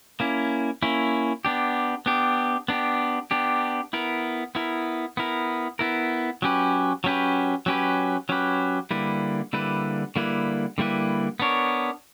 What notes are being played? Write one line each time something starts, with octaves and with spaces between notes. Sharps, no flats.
A#3 C#4 E4
A#3 C#4 E4
B3 D4 G4
B3 D4 G4
B3 D4 G4
B3 D4 G4
B3 E4 A#4
B3 E4 A#4
B3 E4 A#4
B3 E4 A#4
F#3 C#4 G4 B4
F#3 C#4 G4 B4
F#3 C#4 G4 B4
F#3 C#4 G4 B4
D3 G3 A#3 E4 B4
D3 G3 A#3 E4 B4
D3 G3 A#3 E4 B4
D3 G3 A#3 E4 B4
B3 D4 A#4 C#5